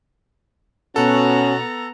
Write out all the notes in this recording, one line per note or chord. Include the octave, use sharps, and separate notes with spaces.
B2 B3 C#4 F#4 A4 A#5